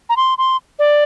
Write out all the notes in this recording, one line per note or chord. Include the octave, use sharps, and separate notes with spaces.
A#5
C6
C6
D5